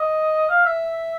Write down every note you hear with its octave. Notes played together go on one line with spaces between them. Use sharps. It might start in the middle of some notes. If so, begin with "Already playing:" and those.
Already playing: D#5
F5
E5